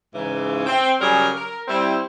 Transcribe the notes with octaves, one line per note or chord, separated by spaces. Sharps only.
G#2 C#3 E3
C4
C#3 F#3 G3 G4 G#4 A#4
A#4
G3 C4 E4